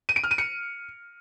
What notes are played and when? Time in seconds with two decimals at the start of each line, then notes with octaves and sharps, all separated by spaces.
0.09 D#7
0.16 D7
0.24 F6
0.31 D#7
0.38 C#7